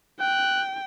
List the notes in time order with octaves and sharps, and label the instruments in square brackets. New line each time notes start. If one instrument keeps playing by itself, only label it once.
[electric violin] G5 [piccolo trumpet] F#6